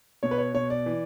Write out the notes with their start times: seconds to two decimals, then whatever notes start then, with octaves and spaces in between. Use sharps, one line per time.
0.23 B2 C#5
0.31 B4
0.38 C#5
0.54 B2 C#5
0.70 D5
0.86 E3